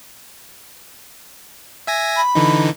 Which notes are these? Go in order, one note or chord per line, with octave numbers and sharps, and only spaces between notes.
E5 G#5 A#6
B5
D3 E3 D#4